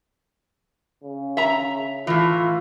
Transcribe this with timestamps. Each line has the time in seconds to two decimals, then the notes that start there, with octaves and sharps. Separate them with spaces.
1.04 C#3
1.37 E5 A#5
2.07 A2 E3 F4